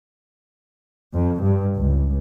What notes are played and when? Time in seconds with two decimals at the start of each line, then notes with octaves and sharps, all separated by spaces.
1.13 F2
1.43 G2
1.77 C#2